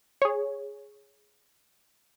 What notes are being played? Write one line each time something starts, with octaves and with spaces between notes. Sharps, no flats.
G#4 C#5